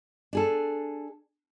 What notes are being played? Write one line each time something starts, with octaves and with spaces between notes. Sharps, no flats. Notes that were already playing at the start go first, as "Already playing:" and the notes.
D4 G#4 A4